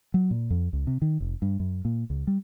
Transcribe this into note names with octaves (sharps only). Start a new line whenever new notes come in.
F#3
A#2
F2
C#2
C3
D#3
F1
G2
F#2
A#2
C#2
G3